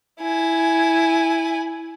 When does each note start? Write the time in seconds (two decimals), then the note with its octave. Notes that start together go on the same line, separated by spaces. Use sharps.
0.21 E4 G#5